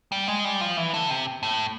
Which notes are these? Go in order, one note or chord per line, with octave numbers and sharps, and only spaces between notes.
G3
G#3
G3
F3
E3
D3
C3
A2